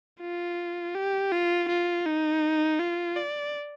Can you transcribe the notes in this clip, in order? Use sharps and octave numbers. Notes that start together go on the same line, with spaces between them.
F4
G4
F4
F4
D#4
F4
D5